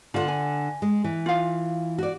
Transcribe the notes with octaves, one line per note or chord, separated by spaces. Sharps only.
D3 F4 F#5
G#5
G#3
E3
F4 F5
F#4 D5